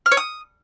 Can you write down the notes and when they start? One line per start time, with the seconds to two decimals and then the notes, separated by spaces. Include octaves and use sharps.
0.06 F6
0.12 C#5
0.17 D#6